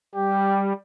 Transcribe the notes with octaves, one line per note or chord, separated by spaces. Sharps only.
G3 G4